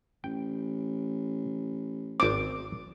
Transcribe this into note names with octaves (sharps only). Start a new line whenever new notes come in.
A1 G5
G#1 C4 D6